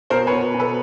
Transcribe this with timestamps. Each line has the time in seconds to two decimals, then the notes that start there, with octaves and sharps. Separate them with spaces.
0.10 B2 A#4 C5
0.27 B4 C#5
0.32 B2
0.54 B2
0.60 A4 B4